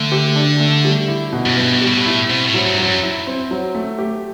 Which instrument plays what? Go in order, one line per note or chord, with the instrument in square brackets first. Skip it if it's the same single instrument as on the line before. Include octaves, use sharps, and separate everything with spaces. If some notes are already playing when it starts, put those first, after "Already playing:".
Already playing: [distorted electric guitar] D3 [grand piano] A3
[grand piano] G4
D4
A3
G3
E4
B2
[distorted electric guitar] F#2
[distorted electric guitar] G2 [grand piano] B3
[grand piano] G3
[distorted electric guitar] B2
A2
[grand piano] E4
[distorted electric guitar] B2 [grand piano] C4
[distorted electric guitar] A2
[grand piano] F#3
[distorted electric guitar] G2
[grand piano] F#3
[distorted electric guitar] F#2
[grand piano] E4
C4
F#3
A3
G4